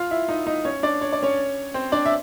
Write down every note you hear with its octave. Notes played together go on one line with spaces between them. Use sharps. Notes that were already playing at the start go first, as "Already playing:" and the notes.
Already playing: F4 F5
E4 E5
D#4 D#5
D#4 D#5
C#4 C#5
D4 D5
C#5
D5
C#4 C#5
C4 C5
D4 D5
E5